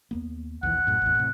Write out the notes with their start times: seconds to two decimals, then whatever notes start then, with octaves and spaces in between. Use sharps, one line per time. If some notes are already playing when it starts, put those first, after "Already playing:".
0.11 D#2 A#3 B3
0.63 A#1 D#2 E3 F#5
0.87 F#2 A2
1.02 A1 E2
1.15 A2 C3